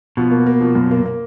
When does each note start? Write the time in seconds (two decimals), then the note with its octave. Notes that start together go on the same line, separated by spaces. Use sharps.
0.17 B2 F3
0.31 A#3
0.46 A#3
0.61 F3
0.75 F#2
0.91 A#3
1.05 A#3